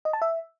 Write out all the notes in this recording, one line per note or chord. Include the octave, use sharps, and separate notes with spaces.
D#5
A5
E5